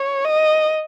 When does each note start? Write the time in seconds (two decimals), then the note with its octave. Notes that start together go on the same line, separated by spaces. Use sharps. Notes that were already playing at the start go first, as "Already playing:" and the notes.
Already playing: C#5
0.24 D#5